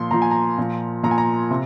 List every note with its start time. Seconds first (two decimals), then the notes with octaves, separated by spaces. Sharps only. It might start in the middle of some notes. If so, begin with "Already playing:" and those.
Already playing: A#2 F3 C6
0.11 A#2 F3 A#5
0.22 G#5
0.31 A#5
0.58 A#2 F3
1.03 A#2 F3 A#5
1.11 G#5
1.18 A#5
1.51 C3